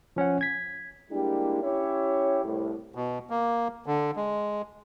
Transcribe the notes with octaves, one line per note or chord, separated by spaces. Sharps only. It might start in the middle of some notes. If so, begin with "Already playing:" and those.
F3 C#4 C#5 F#5
G#6 B6
G3 G#3 A#3 D4 E4 G4
C#4 E4 G4 C#5
C2 A2
B2
A#3
D3
G#3